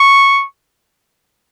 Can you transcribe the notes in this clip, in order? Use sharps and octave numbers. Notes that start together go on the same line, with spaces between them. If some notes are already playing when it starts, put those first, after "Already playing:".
Already playing: C#6